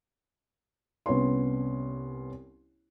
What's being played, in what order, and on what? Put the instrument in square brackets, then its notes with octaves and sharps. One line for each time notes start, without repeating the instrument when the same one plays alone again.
[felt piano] C2 B3 C#4 C#5 C6